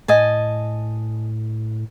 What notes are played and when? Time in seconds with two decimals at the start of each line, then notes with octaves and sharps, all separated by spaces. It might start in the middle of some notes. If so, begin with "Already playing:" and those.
0.08 A2 D#5 G#5 A5